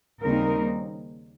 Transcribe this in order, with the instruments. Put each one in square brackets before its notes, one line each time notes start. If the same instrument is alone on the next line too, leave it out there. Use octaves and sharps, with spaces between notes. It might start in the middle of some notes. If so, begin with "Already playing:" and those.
[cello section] D#2 C#3 G3 C4 D#4 A#4